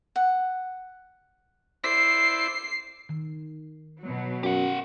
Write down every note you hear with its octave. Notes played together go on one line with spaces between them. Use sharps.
F#5
E4 C5 D5 C7
D#3
B2 F#3
F#2 G4 F#5